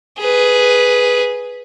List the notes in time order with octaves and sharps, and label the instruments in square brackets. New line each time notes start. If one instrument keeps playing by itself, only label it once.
[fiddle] G#4 B4